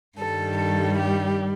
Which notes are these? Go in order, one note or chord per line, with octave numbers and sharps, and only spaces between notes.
G2 D#3 G3 A4
A4
G4